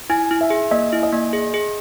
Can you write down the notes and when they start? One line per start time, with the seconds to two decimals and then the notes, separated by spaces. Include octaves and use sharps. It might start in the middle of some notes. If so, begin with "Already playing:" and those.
0.10 E4 G#5
0.31 E4
0.41 E5
0.50 G#4
0.71 A#3 D#5
0.92 E4
1.03 D#5
1.13 A#3
1.33 G#4
1.54 G#4